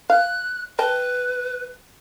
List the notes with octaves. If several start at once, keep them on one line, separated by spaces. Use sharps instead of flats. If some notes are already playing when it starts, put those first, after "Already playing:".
F5 F#6
B4 D#5 G5 A5